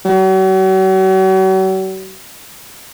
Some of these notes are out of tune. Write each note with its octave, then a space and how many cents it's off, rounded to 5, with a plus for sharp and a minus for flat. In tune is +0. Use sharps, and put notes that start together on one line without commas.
F#3 +40